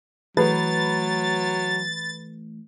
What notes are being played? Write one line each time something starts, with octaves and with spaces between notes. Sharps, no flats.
E3 F#3 A3 B4 A6